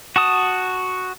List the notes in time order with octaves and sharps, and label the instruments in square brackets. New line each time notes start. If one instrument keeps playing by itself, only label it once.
[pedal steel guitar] F#4 A5 D#6